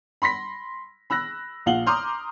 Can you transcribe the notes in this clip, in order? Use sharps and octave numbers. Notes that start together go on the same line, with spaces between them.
B5 C6 A#6 B6
B5 E6 F#6 A#6
A#1 F4 F5 F#5 F#7 G7
A#5 C6 D6 D#6 F6 G6